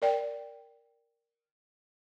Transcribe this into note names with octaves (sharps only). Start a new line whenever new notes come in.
A#4 D5 G5